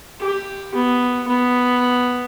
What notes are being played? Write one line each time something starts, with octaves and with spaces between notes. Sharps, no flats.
G4
B3
B3